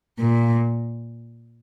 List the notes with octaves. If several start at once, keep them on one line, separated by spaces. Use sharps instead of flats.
A#2